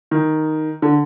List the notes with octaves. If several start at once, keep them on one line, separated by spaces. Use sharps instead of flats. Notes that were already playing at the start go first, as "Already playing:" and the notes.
D#3
D3